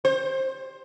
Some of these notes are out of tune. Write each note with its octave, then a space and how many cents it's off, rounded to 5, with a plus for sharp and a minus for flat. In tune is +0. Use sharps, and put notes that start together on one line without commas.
C5 +15